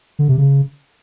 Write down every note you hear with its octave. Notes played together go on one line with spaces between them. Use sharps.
D3
C3
C#3